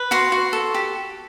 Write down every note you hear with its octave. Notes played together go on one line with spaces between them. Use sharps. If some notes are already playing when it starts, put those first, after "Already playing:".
Already playing: B4
F#4 C6
F#4
A4
G4